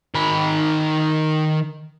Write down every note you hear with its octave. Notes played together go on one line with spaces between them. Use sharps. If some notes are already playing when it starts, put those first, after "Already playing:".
D#3 B5